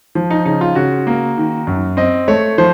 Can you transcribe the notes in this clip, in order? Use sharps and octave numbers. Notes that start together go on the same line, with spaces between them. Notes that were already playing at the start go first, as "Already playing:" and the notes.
F3
D#4
C#3 D#4
F4
C#3 F#4
A#3
D#3
F#2
C4 D#5
A3 C#5
F3 C5